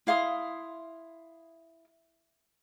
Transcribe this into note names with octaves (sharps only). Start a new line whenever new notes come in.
E4 F5 C6 D#6